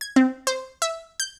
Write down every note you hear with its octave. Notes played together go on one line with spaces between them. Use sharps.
G#6
C4
C5
E5
G6